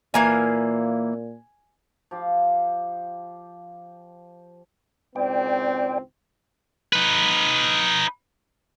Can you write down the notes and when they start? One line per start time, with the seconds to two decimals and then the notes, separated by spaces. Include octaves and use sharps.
0.14 A#2 E3 A#3 F5 G#5 G#6
2.11 F3 G4 F5
5.16 G#1 C#2 C4 D5 G5
6.93 D#4 B4